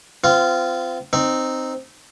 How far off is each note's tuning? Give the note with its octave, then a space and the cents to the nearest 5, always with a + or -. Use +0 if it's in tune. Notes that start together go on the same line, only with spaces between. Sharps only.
C4 -30 F4 -15
C4 +0 D#4 -10